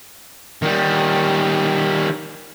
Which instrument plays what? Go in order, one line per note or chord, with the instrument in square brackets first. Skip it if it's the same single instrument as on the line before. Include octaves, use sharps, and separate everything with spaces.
[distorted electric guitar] D#3 G3